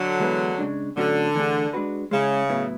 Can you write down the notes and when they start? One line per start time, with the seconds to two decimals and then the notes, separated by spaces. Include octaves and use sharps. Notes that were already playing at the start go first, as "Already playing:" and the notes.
Already playing: D3 F#3
0.20 E3 G#3 B3 E4 B4
0.58 C#3 G#3 D4
0.97 A2 D3 F#3 C#4 F#4
1.35 E3 A3 D4 G#4
1.73 G#3 D4 F#4 B4
2.11 C#3 G#3 C#4 E4
2.49 A2 F#3 B3 E4